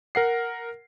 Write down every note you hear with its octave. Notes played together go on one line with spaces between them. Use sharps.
A#4 F#5 C7